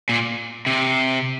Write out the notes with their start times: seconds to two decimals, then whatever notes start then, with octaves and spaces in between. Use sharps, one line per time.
0.09 A#2
0.66 C3